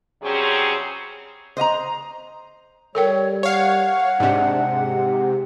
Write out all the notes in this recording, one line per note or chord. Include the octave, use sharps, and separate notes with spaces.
C3 F#3 G3 C4 C#4 G#4
C5 D#5 F5 A#5
G3 A4 A#4 C#5 G5
C#5 F5 F#5
G#2 C3 D4
G4